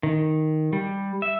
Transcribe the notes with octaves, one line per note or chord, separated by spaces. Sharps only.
D#3
G3
E5